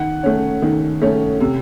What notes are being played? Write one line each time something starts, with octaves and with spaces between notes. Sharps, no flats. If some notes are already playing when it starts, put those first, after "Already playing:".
Already playing: D#3 F#5
A3 C#4
D#3
A3 C#4
C3